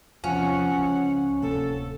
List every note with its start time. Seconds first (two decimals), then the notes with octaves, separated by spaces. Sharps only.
0.24 E2 C3 F3 C#4 F#5
0.78 C#2
1.42 D1 C3 A#3 A4